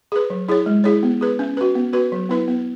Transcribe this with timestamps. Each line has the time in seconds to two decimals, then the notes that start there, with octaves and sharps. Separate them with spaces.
0.12 G#4 B4
0.30 F#3
0.49 E4 G#4 C#5
0.66 G#3
0.84 E4 G#4 C#5
1.03 B3
1.21 G#4 B4
1.39 C#4
1.57 F#4 B4
1.75 B3
1.93 F#4 B4
2.12 F#3
2.29 B3 E4 B4
2.48 B3